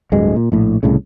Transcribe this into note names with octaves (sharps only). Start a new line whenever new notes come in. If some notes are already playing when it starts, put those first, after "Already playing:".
D1 D2 G2 G#3
A#2
A#1 A2
C2 A2 C#3